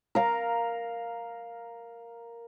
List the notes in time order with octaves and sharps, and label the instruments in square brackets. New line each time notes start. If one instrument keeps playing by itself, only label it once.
[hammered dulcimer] A#4 F5 A#5